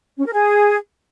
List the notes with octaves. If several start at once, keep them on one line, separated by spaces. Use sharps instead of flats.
C#4
A#4
G#4